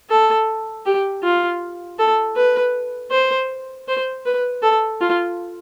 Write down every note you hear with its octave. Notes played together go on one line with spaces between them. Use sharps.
A4
G4
F4
A4
B4
C5
C5
B4
A4
F4